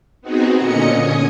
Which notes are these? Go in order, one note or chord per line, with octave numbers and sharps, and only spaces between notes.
B3 C4 D#4 F#4 G#4
A#2 D3 C#4 D#5 C#7
G#5 D#6